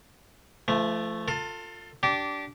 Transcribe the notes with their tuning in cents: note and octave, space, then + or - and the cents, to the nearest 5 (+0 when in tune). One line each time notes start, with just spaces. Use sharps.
F3 -35 A3 +0
F4 +20 A4 +25
D4 -15 G4 -20